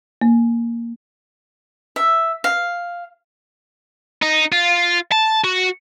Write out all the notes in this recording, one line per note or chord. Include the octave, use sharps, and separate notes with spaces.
A#3
E5
F5
D#4
F4
A5
F#4